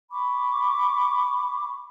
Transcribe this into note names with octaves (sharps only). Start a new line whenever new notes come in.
B5 C#6 D6